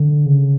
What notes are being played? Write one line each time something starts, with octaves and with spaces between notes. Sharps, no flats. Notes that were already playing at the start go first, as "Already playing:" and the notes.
Already playing: D3
C#3